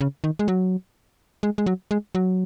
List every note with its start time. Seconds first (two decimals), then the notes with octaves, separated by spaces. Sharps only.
0.01 C#3
0.24 D#3
0.39 G#3
0.48 F#3
1.43 G#3
1.58 G#3
1.66 F#3
1.91 G#3
2.15 F#3